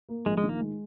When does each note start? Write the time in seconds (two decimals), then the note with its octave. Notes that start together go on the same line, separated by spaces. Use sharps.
0.09 A#3
0.26 A#1 G#3
0.37 G#3
0.43 D#3
0.49 A#3
0.60 G#3